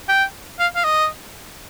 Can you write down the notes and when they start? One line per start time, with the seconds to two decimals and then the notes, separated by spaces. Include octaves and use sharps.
0.09 G5
0.59 F5
0.76 F5
0.84 D#5